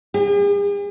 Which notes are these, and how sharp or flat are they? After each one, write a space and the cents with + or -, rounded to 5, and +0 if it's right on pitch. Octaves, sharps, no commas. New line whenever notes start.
G#4 -45